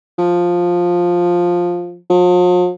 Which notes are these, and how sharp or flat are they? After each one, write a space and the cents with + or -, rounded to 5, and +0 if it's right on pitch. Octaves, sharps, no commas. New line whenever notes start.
F3 +10
F3 +45